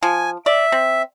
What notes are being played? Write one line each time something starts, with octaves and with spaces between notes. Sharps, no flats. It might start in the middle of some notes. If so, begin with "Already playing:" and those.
F3 G#5
D5 E5
C4